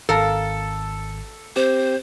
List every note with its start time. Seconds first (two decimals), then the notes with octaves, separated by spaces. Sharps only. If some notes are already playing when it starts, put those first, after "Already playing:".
0.09 G#1 A4 A#4 F5 A5
1.56 C4 G4 C5